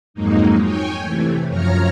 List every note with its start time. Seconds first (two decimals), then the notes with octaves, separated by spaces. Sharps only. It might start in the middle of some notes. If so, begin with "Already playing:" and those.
0.14 F2 G#2 F#3 G#3 A#3 D#4
0.61 C#5 G5 G#5
1.01 C3 E3 A3
1.48 F#2 F3 C#5 A#5 F6